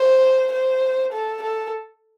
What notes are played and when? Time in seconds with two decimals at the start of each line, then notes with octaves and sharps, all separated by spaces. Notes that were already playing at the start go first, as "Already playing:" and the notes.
Already playing: C5
0.52 C5
1.13 A4
1.42 A4